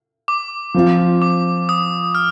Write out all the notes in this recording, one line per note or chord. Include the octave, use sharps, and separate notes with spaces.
D6
F3 C4 F4
D6
D#6
F6